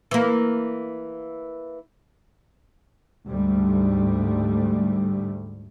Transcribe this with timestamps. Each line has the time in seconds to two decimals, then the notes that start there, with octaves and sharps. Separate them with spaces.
0.11 E3 A#3
3.28 D2 G#2 G3 A3